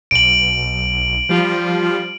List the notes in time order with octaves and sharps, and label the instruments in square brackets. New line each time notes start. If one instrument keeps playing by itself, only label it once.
[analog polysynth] B1 [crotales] D7 F#7
[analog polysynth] F3 G3 F4